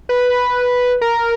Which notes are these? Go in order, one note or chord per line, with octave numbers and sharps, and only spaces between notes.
B4
A#4